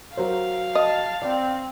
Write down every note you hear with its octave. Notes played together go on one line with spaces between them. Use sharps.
F#3 A#4 C5 F5
D#5 A5
C4 D5